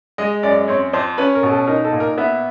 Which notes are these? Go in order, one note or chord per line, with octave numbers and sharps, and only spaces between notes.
G#3 D#5
F#2 D5
C4 C#5
F2 C5
C#4 B4
A#4
B2
A4
D#4 A#4
A4
A#2
A#4
B3 E5